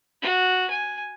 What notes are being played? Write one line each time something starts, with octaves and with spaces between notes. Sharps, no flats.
F#4
G#5